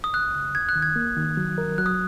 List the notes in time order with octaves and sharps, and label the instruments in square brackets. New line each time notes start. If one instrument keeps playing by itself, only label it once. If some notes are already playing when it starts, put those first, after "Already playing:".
[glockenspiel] D#6
[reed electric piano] C#2 [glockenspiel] F#6
[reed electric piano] C#3
[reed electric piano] D#2 [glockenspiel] G#6
[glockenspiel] F#6
[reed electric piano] D#3
[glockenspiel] G#6
[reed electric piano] A#3
D#3
F#3
A#4
[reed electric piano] F#3 [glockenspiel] F#6
[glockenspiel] D#6